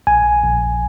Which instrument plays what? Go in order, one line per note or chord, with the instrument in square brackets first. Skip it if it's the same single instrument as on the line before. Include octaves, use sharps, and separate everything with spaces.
[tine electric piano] A#1 G#5
A#1